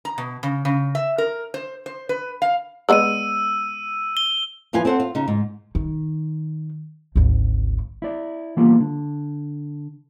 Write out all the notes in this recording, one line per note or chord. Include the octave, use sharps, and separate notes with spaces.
A#5
B2
C#3
C#3
E5
A#4
C5
C5
B4
F5
G#3 B3 D5 E6 D#7
G7
E2 F3 F4 B4 G#5
C4 A4 C5 F#5
F4
C#3 D#4
G#2
D#3
G#1 D2
E4 D5
E3 G3 A#3 B3 F4
D3